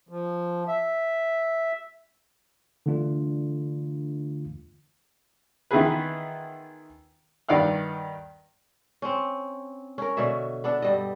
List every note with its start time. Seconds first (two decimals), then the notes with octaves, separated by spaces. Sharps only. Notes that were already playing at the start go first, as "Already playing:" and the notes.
0.09 F3
0.68 E5
2.86 D3 E3 A3 D4 F4
5.71 D#3 E3 B3 F4 G#4 B4
7.49 G2 D#3 D5 F5 F#5 F6
9.02 C4 C#4
9.98 C#4 A#4
10.17 B2 D3 C#5 E5
10.64 B3 D4 A4
10.82 G2 G3 D#5